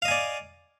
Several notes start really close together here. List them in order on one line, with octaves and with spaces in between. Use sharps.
F5 D#5 G#5 D5